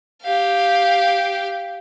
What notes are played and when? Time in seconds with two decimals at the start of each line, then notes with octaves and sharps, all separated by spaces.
0.22 G4 F5